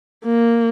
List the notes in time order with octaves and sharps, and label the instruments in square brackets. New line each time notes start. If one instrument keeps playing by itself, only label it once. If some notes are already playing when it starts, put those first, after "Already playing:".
[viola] A#3